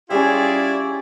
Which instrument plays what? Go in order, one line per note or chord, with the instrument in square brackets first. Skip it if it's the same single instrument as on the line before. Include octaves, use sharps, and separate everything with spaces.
[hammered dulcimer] G3 C#4 [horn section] E4 F4 D5 [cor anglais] G#4